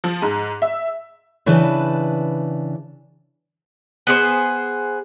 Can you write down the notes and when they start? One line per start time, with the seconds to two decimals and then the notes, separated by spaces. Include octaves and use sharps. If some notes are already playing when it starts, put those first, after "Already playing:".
0.04 F3
0.22 G#2
0.62 E5
1.46 C#3 E3 D4 B4 A5
4.07 B3 G#4 C5